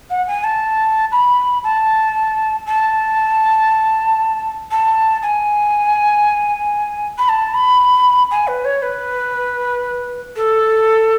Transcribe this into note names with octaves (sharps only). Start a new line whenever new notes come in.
F#5
G#5
A5
B5
A5
A5
A5
G#5
B5
A5
B5
G#5
B4
C#5
B4
A4